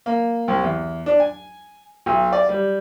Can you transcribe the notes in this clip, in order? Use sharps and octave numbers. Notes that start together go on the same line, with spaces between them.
A#3
C2
E2
D4
G#5
B1
D5
G3